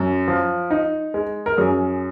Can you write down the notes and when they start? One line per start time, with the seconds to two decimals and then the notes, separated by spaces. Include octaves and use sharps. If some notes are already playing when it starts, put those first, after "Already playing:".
Already playing: F#2
0.28 F3
0.71 D#4
1.14 G#3
1.46 A#4
1.57 F#2 G#4